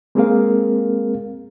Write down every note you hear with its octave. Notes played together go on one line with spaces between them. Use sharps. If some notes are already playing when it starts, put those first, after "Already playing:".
G#3 A#3 C4 G#4 A#4 F5